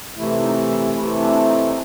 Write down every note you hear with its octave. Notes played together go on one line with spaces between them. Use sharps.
C3 E3 A3 E4
D#4
E4
C3 E3 A3 E4
D4
D#4
D#4